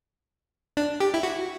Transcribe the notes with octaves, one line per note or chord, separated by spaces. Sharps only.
D4
G4
E4
F#4